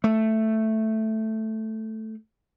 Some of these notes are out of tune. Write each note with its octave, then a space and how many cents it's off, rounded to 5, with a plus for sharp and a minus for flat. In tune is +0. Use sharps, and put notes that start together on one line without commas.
A3 +0